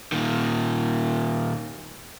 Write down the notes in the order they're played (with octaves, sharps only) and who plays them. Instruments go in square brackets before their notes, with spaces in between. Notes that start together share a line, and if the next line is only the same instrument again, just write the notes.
[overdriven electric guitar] A#2 D#3